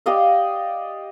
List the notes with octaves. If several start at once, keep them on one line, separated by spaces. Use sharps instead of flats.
G4 D5 D#5 F5